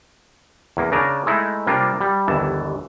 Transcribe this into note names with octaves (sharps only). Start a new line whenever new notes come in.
E2 A#3
C#3 D4 A#4 G#5
G#3 A3 D#4 E4
C3 G3 A#3 D4 F4
G3
G1 D#2 E3 A5